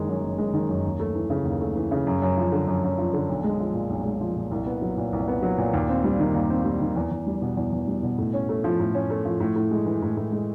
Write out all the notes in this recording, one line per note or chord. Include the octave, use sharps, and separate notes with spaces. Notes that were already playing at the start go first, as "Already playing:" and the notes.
Already playing: F#1 D#3 G#3
F#2
F#1
G#3
D#3
F#2
D#2
A3
E3
C#3
D#2
A3
E3
C#3
F#2
F#2
F3
D3
F#2
F#2
F3
D3
B1
G#3
F3
A#2
B1
G#3
F3
A#2
C2
B3
F#3
A#2
C2
B3
F#3
A#2
D#2
C4
G3
D#3
D#2
C4
G3
D#3
E2
E2
G3
B2
E2
E2
G3
B2
A2
C#4
A3
F3
A2
C#4
A3
F3
A2
A2
G#3
E3
A2
A2
G#3